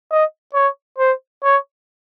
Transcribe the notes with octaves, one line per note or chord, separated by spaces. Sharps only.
D#5
C#5
C5
C#5